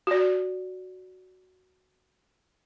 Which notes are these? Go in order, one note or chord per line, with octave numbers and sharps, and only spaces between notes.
F#4 D5